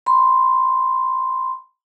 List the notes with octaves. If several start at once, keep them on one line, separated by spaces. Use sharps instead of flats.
B5 C6